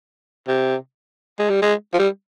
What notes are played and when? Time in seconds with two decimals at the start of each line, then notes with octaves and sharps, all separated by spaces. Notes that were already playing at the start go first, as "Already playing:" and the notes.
0.48 C3
1.39 G#3
1.50 G3
1.62 G#3
1.94 F3
1.99 G3